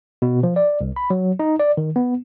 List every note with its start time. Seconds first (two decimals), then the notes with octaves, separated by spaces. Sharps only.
0.22 B2
0.43 F3
0.56 D5
0.81 C2
0.96 B5
1.10 F#3
1.39 D#4
1.59 D5
1.77 D#3
1.96 B3